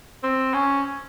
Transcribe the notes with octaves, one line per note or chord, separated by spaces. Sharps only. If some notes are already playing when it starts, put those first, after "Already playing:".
C4
C#4